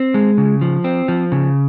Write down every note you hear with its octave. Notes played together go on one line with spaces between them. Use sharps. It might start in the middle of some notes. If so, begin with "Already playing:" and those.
Already playing: C4
G#3
C#3
F3
C4
F3
C#3